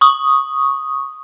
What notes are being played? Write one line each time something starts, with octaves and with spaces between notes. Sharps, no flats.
C#6 D#6